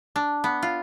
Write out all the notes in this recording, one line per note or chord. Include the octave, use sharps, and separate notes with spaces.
D4
B3
F4